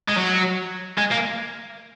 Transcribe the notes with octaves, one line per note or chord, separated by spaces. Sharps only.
G#3
F#3
G#3
A#3